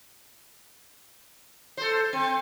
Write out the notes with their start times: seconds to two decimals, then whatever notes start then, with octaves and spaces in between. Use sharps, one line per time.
1.77 A4 C5
2.13 C4